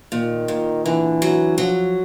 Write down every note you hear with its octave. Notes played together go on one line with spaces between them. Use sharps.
A#2 D#3
A#2
D3 E3
F#3
F3 F#3